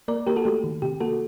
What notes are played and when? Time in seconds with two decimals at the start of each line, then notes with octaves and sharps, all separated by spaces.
0.08 A#3 A#4 D5
0.27 A#3 G4 A#4
0.36 F#4 A4
0.45 A3 G4
0.64 D#3
0.82 C3 G4
1.01 A#3 F#4 A4